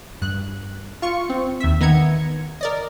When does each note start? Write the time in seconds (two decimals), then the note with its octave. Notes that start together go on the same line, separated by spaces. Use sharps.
0.22 G2 F#6
1.02 F4 C#6 C#7
1.29 C4
1.60 D#2 E5
1.80 D#3 B3 A#5 G#6 C#7
2.61 A#4 D5 D#5